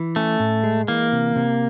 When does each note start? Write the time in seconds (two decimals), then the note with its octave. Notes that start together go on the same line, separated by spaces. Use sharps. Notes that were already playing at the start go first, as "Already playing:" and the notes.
Already playing: E3
0.16 A3 C#4
0.40 A2
0.64 G#3
0.88 E3 A#3
1.12 C3
1.36 C3